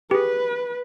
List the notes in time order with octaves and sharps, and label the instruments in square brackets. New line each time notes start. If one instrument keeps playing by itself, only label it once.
[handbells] G4 G#4 [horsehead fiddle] B4